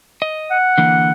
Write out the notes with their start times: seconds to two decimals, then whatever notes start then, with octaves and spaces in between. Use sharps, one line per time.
0.22 D#5
0.50 F#5
0.78 D3 E3 A#3